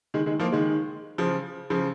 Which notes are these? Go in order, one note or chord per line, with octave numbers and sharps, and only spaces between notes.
D#3 G#3
D#3 G#3
F3 A#3
D#3 G#3
C#3 F3
C#3 F3